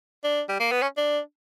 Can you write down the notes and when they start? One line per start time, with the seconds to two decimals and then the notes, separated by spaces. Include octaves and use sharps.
0.24 D4
0.49 G3
0.60 A#3
0.72 B3
0.82 C#4
0.97 D4